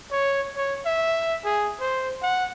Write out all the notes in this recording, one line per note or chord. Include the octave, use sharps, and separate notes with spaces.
C#5
C#5
E5
G#4
C5
F#5